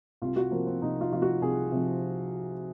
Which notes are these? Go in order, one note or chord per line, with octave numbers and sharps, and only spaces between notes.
C2 F4
F#4
C3 F3 A#3
C4
C2 D#4
F4
C3 F3 F4
F#4
C2 G#4
C3 F3